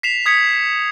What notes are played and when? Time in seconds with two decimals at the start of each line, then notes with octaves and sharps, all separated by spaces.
0.03 B6 C7 E7 F7
0.26 D#6 G#6 B6 C#7